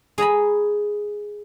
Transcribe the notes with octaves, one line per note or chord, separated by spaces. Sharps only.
G#4 G#5 A#5 B5